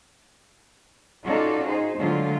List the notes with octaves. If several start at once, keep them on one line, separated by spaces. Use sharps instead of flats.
C#4 D#4 F4 F#4 A4 D5
D#4 G#4 C5
D3 F#3 G#3 A3 F4